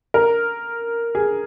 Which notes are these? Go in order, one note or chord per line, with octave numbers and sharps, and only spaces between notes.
A#4
G#4